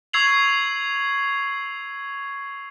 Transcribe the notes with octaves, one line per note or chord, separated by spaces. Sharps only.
C#6 E6 G#6 C7 F7 F#7